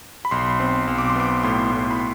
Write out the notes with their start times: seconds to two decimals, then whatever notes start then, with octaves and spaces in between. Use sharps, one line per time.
0.25 B5
0.31 B1 C6
0.60 C4
0.87 B1
0.98 D6
1.10 C6
1.16 B3 D6
1.43 A2 C6
1.71 A2
1.91 B5